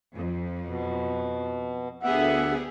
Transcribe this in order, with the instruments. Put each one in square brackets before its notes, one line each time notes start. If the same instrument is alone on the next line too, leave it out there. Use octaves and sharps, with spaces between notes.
[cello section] F2
[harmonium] B2
[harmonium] D2 E5 F#5 [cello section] B3 G4 G#4